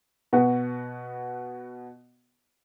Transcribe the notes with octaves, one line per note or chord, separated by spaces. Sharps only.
B2 B3 F#4